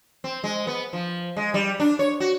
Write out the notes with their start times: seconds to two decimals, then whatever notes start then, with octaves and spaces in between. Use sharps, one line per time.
0.24 C4
0.44 G#3
0.67 B3
0.93 F3
1.37 G#3
1.54 G3
1.80 D4
1.99 C#5
2.20 F#4